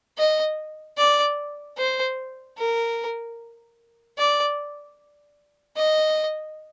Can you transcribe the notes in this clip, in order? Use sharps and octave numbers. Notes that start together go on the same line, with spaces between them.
D#5
D5
C5
A#4
D5
D#5